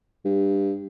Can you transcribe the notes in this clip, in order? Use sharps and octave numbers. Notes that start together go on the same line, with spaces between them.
G2